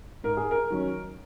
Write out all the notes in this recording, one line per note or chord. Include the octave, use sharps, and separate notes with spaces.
G#2 A#4
G#4
A#4
D#3 F#3 C#4